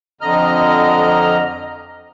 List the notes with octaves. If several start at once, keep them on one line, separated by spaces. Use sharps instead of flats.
F2 D3 D#5 A#5 F6